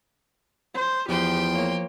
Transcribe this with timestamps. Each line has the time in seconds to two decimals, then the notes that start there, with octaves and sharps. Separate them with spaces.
0.74 C5
1.08 E2 F3 G4 G5 C6
1.54 A#3 C#5